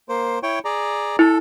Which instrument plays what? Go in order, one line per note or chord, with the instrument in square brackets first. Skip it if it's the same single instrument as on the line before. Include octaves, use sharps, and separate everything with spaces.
[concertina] A#3 C5
E4 C#5 G5
G#4 D5 A#5
[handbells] E4 [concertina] A4